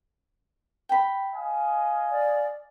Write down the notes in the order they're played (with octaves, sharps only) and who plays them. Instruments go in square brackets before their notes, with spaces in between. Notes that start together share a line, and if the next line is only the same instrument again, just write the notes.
[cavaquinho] G5 B5
[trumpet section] D#5 F5 G#5
[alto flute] D5